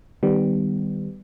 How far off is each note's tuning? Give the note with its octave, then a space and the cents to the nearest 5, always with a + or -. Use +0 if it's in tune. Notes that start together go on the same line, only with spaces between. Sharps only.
D#3 -20 G3 +0 B3 +20